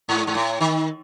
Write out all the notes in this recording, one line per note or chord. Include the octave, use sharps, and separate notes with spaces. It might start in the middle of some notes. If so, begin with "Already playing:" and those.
G#2
G#2
A2
D#3